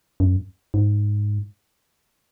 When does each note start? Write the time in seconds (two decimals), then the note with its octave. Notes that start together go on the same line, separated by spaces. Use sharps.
0.20 F#2
0.74 G#2